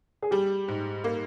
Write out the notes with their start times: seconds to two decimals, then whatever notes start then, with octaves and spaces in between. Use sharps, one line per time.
0.23 G#4
0.31 G3 G4
0.68 G#2
1.04 A#3